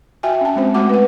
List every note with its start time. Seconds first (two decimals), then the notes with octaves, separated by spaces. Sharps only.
0.23 F#4 E5 G5 G#5
0.41 C#4 A5
0.56 G#3 C4 C5
0.74 G#3 A3 F#4 F#5 D6
0.89 B4 F#5